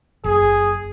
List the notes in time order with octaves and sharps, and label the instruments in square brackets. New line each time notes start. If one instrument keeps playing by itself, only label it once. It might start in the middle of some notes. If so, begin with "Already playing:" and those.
[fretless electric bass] F#1 [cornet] G#4